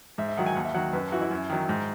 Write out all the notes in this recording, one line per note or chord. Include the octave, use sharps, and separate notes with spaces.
G#2 E5
E5
D#3 F#3 F#5
G#5
D#2 F#5
E5
D#3 F#3 F#5
F#2 B4
E3 F#4
E4
F#2
D#3 F#3
G#2